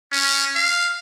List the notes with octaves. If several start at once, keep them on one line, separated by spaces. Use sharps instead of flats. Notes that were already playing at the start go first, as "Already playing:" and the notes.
C#4
F5